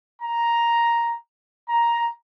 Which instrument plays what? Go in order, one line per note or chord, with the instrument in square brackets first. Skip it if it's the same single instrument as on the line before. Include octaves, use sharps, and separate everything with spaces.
[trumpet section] A#5
A#5